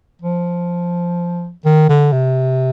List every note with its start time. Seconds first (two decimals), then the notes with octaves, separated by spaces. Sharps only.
0.22 F3
1.65 D#3
1.89 D3
2.12 C3